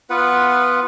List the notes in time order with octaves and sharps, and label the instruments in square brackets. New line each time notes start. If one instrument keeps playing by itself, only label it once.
[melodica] B3 F4 B4 F#5